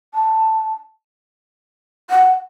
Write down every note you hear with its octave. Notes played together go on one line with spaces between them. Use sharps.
A5
F#5